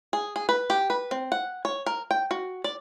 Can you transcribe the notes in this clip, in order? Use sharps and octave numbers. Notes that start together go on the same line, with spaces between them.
G#4
G#4
B4
G4
B4
C4
F#5
C#5
A#4
G5
F#4
D5